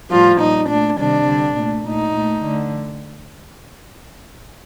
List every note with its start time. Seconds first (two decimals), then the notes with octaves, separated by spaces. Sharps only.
0.09 A2 F3 G3 F4
0.38 A#2 G3 D#4
0.68 A#2 A3 D4
0.97 C3 D#3 G3 D4
1.27 D3 G3
1.57 A#2 A3
1.85 A#2 A3 D#4
2.15 A#2 A3
2.44 D3 A3